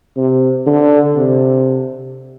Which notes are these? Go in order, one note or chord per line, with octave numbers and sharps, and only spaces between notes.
C3
D3
C3